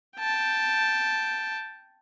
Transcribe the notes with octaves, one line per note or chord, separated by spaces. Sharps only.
G5 A5